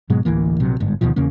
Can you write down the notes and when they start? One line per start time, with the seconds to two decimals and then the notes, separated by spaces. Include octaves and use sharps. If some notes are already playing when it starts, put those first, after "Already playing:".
0.10 G#2 B2 F#3 G#3
0.25 A1 D2 E3 A#3
0.60 A#1 C3 F#3
0.80 G1 G#2
1.01 D2 B2 D#3 F3
1.16 E2 C#3 A#3 C#4